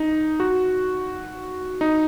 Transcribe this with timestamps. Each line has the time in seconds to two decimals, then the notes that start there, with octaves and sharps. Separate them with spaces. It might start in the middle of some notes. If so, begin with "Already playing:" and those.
Already playing: D#4
0.40 F#4
1.81 D#4